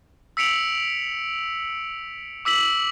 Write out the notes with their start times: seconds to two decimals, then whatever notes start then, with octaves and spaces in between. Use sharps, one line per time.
0.37 E6 B6 C#7 D7 F7 F#7
2.45 D6 E6 B6 F#7